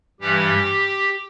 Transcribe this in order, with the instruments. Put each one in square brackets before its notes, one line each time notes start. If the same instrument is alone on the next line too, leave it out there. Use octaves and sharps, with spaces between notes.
[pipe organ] G2 E3 G3 G4